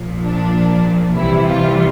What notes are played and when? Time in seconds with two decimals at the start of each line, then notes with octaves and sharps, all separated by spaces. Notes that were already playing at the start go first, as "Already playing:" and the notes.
Already playing: A#1 A#2 F3
0.22 D4
1.16 C2 C3 E3 G3 E4
1.48 F4